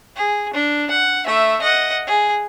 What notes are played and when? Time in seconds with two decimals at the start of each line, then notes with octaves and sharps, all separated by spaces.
0.16 G#4
0.54 D4
0.90 F#5
1.26 A3 E5
1.62 D#5 F#5
2.07 G#4